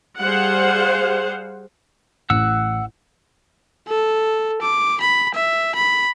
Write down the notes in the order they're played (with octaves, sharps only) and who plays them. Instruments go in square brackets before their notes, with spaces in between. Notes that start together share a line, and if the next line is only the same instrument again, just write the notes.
[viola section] G3 G#4 C5 F5 F#5
[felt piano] A1 [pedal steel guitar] F#5 E6
[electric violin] A4
D6
B5
E5
B5